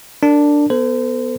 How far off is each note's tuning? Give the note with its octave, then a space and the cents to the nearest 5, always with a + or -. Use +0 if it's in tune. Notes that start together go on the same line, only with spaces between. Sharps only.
D4 +0 A#4 -35
B3 +0 A4 +30 C5 -35